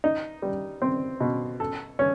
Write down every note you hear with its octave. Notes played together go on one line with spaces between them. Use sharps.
D#4
G3
C4
B2
A4
C#4